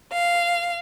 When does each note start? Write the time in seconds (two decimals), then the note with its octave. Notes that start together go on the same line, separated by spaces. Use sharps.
0.12 F5